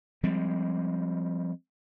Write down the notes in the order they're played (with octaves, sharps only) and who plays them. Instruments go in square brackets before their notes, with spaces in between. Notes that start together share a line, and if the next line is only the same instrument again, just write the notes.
[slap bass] F3 G3 G#3 C4